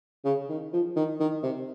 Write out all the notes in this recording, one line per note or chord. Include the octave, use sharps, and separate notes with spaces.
C#3
D#3
F3
D#3
D#3
C3